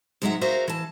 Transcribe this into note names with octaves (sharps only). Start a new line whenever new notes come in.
G#2 F#3 G#3 A4 E5 F#5
F#4 G#4 A#4 C5 E5 F5
E3 A5